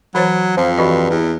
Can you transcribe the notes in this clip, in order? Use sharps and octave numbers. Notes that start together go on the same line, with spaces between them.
E3 F#3 C5 C#5
F2 F3
G2 E3 F#4 D#5
E2